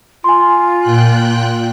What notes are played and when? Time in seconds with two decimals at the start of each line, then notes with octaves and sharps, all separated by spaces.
0.24 F4 G#5 C6
0.81 A#2 G5 F#6